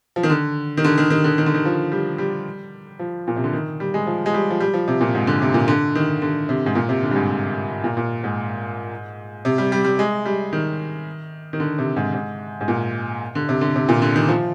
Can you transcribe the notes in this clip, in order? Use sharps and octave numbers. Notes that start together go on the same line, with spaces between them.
F3
D#3
D3
D#3
D3
D#3
D#3
D3
D#3
D3
D#3
F3
G3
G3
F3
A#2
C3
D3
D#3
G3
G#3
F3
G#3
G3
F3
G3
F3
C3
A#2
G#2
D3
C3
A#2
D3
D#3
D3
C3
G#2
A#2
C3
D3
G2
G#2
A#2
A#2
G#2
C3
G3
G3
G3
G#3
G3
D#3
D#3
D3
C3
G#2
G#2
G#2
A#2
D3
C3
D3
C3
A#2
D3
D#3
F3